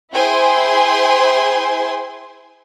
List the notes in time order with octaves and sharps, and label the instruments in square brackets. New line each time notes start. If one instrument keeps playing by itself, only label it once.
[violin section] E4 G#4 C5 G5 G#5 C6